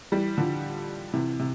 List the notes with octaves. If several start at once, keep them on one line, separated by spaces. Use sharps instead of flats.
E3 G3
D3 F3
C3 E3
C3